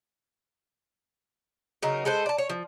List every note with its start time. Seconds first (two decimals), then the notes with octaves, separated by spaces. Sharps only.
1.83 C#3 F#3 D#4 A#4
2.05 G#3 A4 B4 C5
2.26 D5 A5
2.38 C#5
2.50 F3